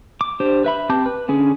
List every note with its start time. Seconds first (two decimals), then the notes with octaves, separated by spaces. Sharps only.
0.21 D6
0.40 D4 G4 C5
0.64 B4 E5 B5
0.89 C4 G4 A5 D6 G6
1.06 B4
1.28 D3 C#4 G#4